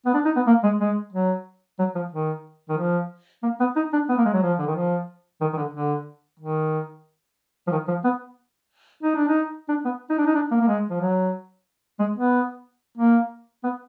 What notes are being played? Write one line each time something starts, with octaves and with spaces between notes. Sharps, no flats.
B3
D4
D#4
B3
A#3
G#3
G#3
F#3
F#3
F3
D#3
D#3
F3
A#3
B3
D#4
D4
B3
A#3
G#3
F#3
F3
D3
D#3
F3
D#3
D#3
D3
D3
D#3
F3
D#3
F3
B3
D#4
D4
D#4
D4
B3
D#4
D4
D#4
D4
A#3
A#3
G#3
F3
F#3
G#3
B3
A#3
B3